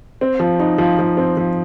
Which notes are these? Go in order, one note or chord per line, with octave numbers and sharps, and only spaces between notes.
C4
F3
D#4
F3
F3
C4
F3